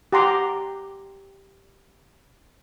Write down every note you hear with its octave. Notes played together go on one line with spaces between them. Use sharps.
G4 F#5 A#5 C6 D6